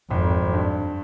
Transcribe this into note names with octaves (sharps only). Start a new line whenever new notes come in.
G#1 F2
G2